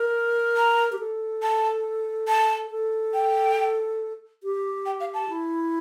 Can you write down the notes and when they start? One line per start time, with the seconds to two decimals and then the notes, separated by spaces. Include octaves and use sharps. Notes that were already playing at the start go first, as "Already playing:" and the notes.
Already playing: A#4
0.56 A#5
0.92 G4
0.99 A4
1.42 A5
2.28 A5
2.71 A4
3.14 G5
4.43 G4
4.86 G5
5.00 F5
5.14 A5
5.29 E4